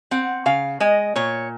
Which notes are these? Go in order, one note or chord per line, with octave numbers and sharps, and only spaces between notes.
C4 F#5
C#3 F5
G#3 D#5
A#2 C#5